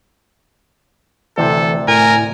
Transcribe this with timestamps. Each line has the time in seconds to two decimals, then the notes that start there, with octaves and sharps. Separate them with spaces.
1.38 D2 C3 E3 A4 C5
1.88 A2 A#4 G#5